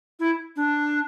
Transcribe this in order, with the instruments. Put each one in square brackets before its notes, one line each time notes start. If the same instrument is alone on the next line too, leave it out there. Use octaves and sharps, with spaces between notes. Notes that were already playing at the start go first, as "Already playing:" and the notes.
[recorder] E4
D4